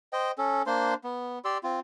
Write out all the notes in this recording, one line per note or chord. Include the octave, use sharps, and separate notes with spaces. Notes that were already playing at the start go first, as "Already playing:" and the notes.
C5 D#5 G5
C#4 A4
A#3 D4 C5 C6
B3
G4 D5 C6 E6
C4 F4